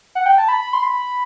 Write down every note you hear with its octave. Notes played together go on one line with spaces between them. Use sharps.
F#5
G5
A5
B5
C6
B5